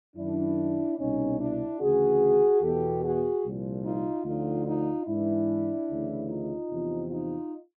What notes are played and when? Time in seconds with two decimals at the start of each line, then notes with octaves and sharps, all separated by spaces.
0.16 F#2 D#3 D4 E4
0.98 C2 B2 C#4 D#4
1.40 D4 E4
1.80 D2 C#3 E3 F#4 G#4
2.62 E2 B2 G4 A4
3.02 F#4 G#4
3.43 C2 A#2 F3
3.84 D#4 F4
4.25 D2 D3 F3 D#4 F4
4.66 D#4 F4
5.07 G#2 E3 D4 E4
5.89 D2 C#3 E3
6.29 D#4 F4
6.71 E2 C3 F3
7.11 D#4 F4